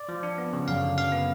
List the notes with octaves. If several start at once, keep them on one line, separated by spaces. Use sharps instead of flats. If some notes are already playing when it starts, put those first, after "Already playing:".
Already playing: D5
F3
D4
B3
C#3
F#2 F5
D3
F#2 F5
B3